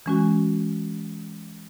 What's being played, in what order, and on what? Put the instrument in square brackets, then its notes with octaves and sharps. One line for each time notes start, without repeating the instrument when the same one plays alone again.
[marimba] E3 G#3 C#4 F#4